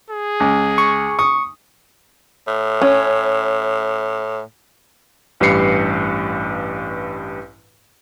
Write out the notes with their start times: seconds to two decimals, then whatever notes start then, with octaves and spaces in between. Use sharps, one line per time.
0.10 G#4
0.40 C#2
0.78 C#6
1.19 C#6 D#6
2.48 A2
2.81 C#4
5.40 A1 G2 G4 B4 C7 C#7